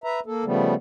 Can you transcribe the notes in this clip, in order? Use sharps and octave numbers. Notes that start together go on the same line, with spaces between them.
B4 E5 A#5
A#3 A4
C#3 F3 G3 A3 B3